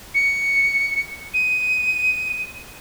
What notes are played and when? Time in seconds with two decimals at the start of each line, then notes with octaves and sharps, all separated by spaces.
0.14 C#7
1.34 D#7